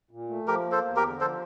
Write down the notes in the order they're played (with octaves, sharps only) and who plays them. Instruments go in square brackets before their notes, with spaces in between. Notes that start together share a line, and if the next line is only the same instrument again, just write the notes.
[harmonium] A#2
A3
[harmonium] F3 [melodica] G4 A#4
[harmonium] A#3
[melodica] A4 C5
[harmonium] E2
[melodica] G4 A#4
[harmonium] D3
[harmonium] F3 [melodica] A4 C5